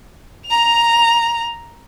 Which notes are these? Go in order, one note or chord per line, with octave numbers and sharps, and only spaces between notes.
A#5 F7